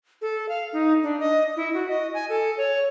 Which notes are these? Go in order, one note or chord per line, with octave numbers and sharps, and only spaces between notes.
A4
F5
D#4
D4
D#5
E4
F#4
D#5
G#5
A4
C#5